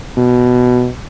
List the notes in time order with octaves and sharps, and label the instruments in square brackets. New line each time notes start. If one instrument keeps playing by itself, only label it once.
[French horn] B2